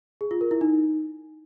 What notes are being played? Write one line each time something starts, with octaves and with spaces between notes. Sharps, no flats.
G#4
F4
A#4
E4
D#4